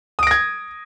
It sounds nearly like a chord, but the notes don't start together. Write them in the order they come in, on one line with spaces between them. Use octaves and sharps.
D#6 D7 A#6 G#6